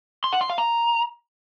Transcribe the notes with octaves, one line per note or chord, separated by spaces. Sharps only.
C6
F#5
C6
F5
A#5